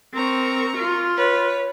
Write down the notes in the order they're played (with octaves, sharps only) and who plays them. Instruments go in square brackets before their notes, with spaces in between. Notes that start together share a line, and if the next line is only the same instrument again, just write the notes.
[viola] C4 [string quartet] A#4 A#5 C#6
[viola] F4
[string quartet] B4 C#5